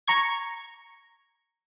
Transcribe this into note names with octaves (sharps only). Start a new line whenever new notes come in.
A#5 C#6 G#6